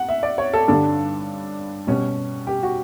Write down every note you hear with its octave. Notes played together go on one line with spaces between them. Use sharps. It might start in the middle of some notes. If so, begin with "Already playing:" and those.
Already playing: F#5
E5
D5
C#5
A4
G2 D3 G3 D4 A4
B2 G3 C#4
G4
F#4